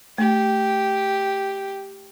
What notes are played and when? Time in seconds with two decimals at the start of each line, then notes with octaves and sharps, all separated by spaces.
0.18 A3 G4